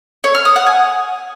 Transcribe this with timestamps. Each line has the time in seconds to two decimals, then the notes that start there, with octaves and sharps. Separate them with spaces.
0.24 C#5
0.35 F6
0.45 D#6
0.56 F#5
0.66 G#5